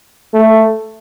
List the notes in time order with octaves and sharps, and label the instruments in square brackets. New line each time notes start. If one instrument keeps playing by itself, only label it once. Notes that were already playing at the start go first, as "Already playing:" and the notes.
[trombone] A3